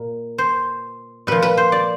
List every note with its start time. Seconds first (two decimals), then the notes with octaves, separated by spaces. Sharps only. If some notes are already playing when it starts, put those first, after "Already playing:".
Already playing: A#2 A#4
0.38 C5
1.27 A#2 F3 B4
1.42 B4
1.57 C5
1.72 D5